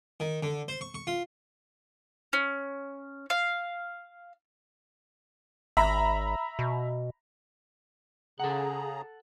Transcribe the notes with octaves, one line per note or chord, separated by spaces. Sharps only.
D#3
D3
C5
C#6
C#6
F4
C#4
F5
G#1 E5 A#5 B5
B2
C#3 G#4 A4 F#5 A#5